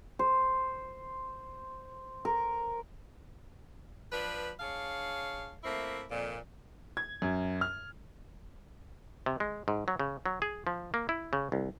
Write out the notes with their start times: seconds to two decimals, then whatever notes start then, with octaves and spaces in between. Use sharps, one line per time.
0.19 C5
2.25 A#4
4.12 F3 D4 B4
4.60 D4 G#4 C#5 F5
5.64 A3 A#3 C4 E4
6.11 F2 A#2
6.97 G#6
7.22 F#2
7.61 F6
9.26 C3
9.40 G#3
9.68 G#2
9.88 F#3
10.00 C#3
10.26 F#3
10.42 G#4
10.67 F3
10.94 A#3
11.09 E4
11.33 C#3
11.52 C2